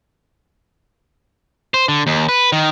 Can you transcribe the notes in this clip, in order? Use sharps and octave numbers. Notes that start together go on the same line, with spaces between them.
C5
D3
D#2
B4
D#3